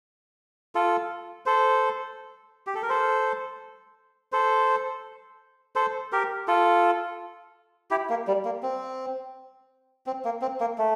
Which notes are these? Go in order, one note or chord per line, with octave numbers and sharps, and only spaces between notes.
F4 A4
A4 C5
G4
A4
A#4
A4 C5
A4 C5
A4 C5
G4 A#4
F4 A4
E4 G4
A#3
G3
A#3
C4
C4
A#3
C4
A#3
A3